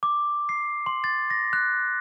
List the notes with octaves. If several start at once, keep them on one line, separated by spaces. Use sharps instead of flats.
D6
C7
C6
A6
A#6
F#6